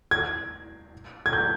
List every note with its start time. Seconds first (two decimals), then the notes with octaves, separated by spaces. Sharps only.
0.11 G#6
1.26 G#6
1.33 G6